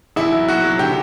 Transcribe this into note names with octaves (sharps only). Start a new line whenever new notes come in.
A1 E4
F#3
F#3 F#4
F#3
D3 G4